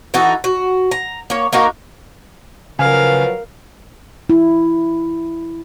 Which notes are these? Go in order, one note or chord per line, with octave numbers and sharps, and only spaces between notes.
E3 D#4 F#4 A4
F#4
A#5
A#3 C#5
A#3 D#4 F#4 A#4
C#3 F3 F#3 A#4 B4 F5 G#5
E4